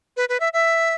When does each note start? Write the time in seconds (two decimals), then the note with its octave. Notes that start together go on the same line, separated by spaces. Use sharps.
0.17 B4
0.29 B4
0.40 E5
0.53 E5